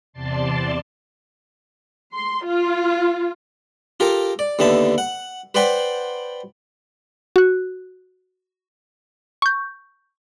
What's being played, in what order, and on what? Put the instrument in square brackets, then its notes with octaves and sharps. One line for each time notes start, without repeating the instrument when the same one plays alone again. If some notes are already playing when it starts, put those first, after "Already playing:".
[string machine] E2 C3 D5 A5 C6
[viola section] C6
F4
[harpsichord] F4 G4 A4 A#4
D5
D#2 D3 B3 E5 A5
F#5
B4 C5 D5 F#5 G5 B5
[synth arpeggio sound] F#4 F#6
C#6 G6